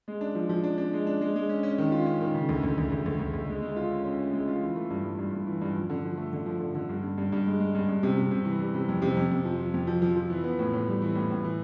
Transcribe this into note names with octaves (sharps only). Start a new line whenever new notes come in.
G#3
D4
F3
F3
D4
D4
G#3
D4
G#3
G#3
C#4
C#4
D#3
F4
C#4
D#3
C#3
D2
D2
D2
D2
D2
D2
D2
G#3
G#3
F4
C#4
C#4
C#4
G#3
F4
E3
A3
G2
G2
G2
G2
E3
G2
F3
D3
F3
A3
D3
F3
D3
D3
G2
G2
G2
G2
G#3
G#3
G2
G2
C3
C3
C3
E3
G3
C3
F2
C3
F2
F2
F3
F3
F2
F3
F3
F3
E3
B3
A2
A2
G3
E3
A2
A2
E3